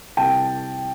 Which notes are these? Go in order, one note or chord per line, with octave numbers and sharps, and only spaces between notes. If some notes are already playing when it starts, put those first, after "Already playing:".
C2 G5 A5